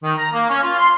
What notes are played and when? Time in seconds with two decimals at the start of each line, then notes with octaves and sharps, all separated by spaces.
0.04 D#3
0.18 A#5
0.33 A#3
0.49 C#4
0.64 F4
0.78 C6